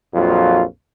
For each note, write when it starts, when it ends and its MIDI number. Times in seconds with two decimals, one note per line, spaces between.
0.14 0.64 34
0.14 0.64 41
0.14 0.64 54
0.14 0.64 65